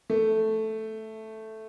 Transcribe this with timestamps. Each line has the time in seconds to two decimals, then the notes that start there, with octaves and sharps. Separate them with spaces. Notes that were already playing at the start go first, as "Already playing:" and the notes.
0.10 A3